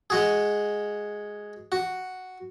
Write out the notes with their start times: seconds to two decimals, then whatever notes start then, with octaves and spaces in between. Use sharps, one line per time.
0.10 G#3 F#4 G#4
1.72 F#4